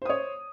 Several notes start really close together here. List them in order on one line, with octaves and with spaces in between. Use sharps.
C5 D#6 C#5